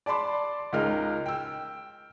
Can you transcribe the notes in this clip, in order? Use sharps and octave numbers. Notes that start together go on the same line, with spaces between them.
D5 A5 B5 C6 D6
C#2 G#3 D#4 A#4 F6
G5 E6